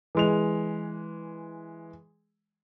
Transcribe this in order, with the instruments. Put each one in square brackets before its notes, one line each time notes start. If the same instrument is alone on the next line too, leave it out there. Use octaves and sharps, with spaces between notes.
[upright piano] E3 G#3 F7